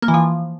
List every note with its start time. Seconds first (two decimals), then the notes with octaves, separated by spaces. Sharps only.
0.02 A#3
0.08 E3
0.14 F3